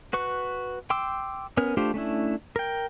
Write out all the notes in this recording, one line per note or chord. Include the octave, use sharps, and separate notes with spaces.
F#4 B4 C#6
G5 C6 D6 E6
B3 C#4 A#4
A3 D4 F4 G4 C5
A3 C#4 D4 E4
A#4 G5